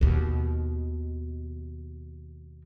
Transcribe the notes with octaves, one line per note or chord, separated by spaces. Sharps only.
D#2 B2